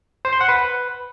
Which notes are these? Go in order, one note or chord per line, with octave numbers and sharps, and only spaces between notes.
C5
C6
F#5
B4